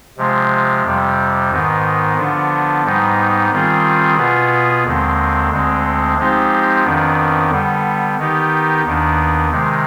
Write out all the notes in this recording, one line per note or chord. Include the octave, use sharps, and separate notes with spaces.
C3 F3 G#3
F2 C3 G3
G#2 D#3 B3
D3 F3 B3 D4
G#2 G3 B3 D#4
D#3 G3 C4 F4 G#4
B2 B3 F4 G#4 B4
D#2 D3 G#3 C4
D2 D3 G#3 C4
F3 G#3 C4 D#4 G4
F2 D#3 B3 D4
D3 G3 B3
D#3 B3 D#4 G4
D#2 D#3 B3 D4
C3 D#3 G#3